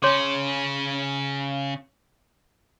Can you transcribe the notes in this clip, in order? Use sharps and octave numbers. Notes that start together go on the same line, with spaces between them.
C#3 C#4 C#5 C6 D6